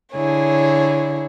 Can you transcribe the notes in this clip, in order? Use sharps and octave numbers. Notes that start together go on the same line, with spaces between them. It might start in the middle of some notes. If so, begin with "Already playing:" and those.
D3 E4 G#4 C#5